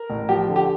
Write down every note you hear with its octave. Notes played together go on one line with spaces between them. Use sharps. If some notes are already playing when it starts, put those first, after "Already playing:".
Already playing: A#4
A1
F3 G4
D3
G4